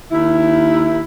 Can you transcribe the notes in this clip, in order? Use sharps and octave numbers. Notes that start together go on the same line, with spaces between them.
D#2 E4